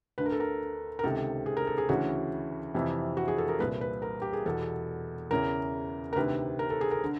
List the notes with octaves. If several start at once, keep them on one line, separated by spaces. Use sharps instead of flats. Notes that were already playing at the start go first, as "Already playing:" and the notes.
D2 D3 B4
A#4
A4
A#4
A#4
C#2 C3 D#3 A4
G#4
A#4
A4
G#4
D2 C#3 E3 F#4
F2 C3 E3
F#4
G#4
A4
A#4
C2 A#2 B4
B4
A#4
G4
G#4
E2 B2 A4
E2 C#3 E3 A#4
A#4
D2 C3 D#3 B4
A#4
A4
G#4
A#4
D3